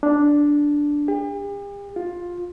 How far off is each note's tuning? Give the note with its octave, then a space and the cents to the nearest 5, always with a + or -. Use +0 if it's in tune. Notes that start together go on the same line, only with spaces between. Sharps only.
D4 -5
G4 +45
F4 +15